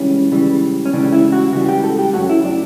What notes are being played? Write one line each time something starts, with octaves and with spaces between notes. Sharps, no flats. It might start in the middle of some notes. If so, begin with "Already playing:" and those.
Already playing: C#2 C#3 E3 G3 C#4
C#2 C#3 E3 G3
C#4
C#2 C#3 E3 G3 D4
E4
F#4
C#2 C#3 E3 G3 F#4
G4
A4
G4
F#2 C#3 F#3 A3 F#4
E4
D4